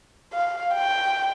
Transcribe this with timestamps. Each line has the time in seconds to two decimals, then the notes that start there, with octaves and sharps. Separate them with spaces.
0.33 F5
0.74 G5